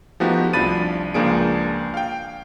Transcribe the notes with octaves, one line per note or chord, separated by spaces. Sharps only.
F3 A3 B3 D#4 F#4 G4
C2 F3 D4 B5 A6 D#7
C#2 F3 A#3 D4 G#4 D7
F5 G5